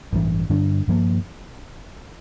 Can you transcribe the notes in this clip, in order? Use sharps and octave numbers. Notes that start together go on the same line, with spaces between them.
A1 G2 E3
G2 D3 G3 D4
G2 F3 A#3